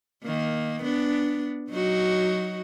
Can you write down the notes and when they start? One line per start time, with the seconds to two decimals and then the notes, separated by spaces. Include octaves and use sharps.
0.24 D#3 A#3
0.83 B3 D4
1.70 F#3 D#4 F#4